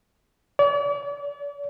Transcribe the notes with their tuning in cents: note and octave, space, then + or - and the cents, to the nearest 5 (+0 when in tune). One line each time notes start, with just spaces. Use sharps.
D5 -40